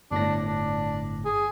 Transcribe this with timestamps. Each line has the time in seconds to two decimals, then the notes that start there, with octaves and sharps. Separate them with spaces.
0.11 G1 A2 D4 A#6
0.47 D4
1.25 G#4